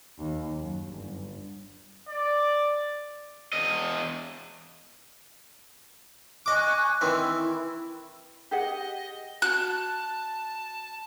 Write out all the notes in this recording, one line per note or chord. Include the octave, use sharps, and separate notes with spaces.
D#2
F#2
G1
D5
E2 D#5
D#5 G#5 C#6 D6 F#6
D#3 E3 C4 E6
E4
G4 G#4 D#5 F#5
F#4 A5 F#6